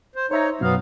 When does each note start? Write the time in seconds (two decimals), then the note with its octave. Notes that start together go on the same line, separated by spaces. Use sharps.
0.15 C5
0.31 D#4 C5 C#5 E5 A#5
0.61 F#2 B2 F#3 B3 F5